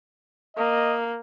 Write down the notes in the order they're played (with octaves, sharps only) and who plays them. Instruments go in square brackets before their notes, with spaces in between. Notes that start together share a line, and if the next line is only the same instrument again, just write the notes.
[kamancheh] A#3 [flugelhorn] D#5